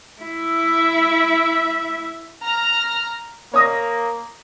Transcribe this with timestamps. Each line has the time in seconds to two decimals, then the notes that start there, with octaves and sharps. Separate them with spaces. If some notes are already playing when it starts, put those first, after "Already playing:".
0.22 E4 E5
2.42 A#5 F6
3.54 A#3 C#5 D#6 A#6